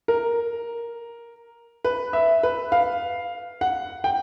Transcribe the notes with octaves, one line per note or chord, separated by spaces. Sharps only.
A#4
B4
E5
B4
F5
F#5
G5